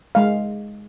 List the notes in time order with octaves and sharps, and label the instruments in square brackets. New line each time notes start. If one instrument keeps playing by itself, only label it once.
[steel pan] G#3 F5